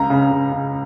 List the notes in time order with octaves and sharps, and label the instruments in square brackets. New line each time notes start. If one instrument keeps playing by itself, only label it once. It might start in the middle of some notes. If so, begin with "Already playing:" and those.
Already playing: [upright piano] C#2 A#5
C#3
C#3
C#3